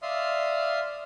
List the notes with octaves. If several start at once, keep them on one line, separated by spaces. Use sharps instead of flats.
D5 E5 F5 C6 D#6 F6